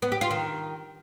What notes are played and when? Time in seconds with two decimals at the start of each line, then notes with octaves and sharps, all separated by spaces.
0.02 B3
0.12 G4
0.21 F4
0.31 D#3